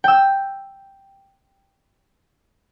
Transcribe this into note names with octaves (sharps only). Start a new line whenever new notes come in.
G5 E6